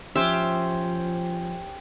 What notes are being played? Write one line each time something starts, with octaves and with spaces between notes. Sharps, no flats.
F3 C#4 G4 C5 E5